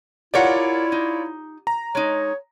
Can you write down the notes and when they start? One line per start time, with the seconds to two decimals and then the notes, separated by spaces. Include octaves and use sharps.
0.34 E4 F4 G4 A#4 C#5 D5 F#5
0.92 D#4
1.67 A#5
1.95 G#3 D#4 C#5